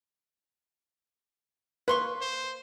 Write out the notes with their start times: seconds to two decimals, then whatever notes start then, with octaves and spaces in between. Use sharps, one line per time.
1.88 A#3 B4 C6 C#6
2.21 C5